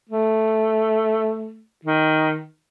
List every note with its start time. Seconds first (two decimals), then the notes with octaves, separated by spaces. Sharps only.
0.09 A3
1.85 D#3